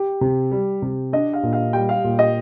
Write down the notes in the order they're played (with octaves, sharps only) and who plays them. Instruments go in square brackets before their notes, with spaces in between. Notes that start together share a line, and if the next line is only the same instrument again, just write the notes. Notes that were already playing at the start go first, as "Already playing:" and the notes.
Already playing: [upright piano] G4
[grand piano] C3
G3
C3
[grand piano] D4 [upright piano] D#5
[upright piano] F5
[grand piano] A#2
[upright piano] F5
[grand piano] G3 [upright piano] G5
[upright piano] F5
[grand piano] A#2
[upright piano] D#5